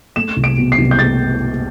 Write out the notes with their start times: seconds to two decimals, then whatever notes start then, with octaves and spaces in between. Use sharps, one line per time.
0.16 A3 E7
0.36 C2
0.44 D7
0.58 B2
0.72 C7
0.78 C2
0.91 G6
0.99 A3 A6